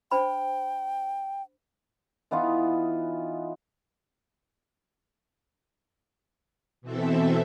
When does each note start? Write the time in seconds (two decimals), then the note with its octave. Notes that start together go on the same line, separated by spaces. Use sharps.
0.11 D4 C5 G5 B5
2.31 E3 B3 D#4 F4
6.81 B2 E3 C4 A4 E5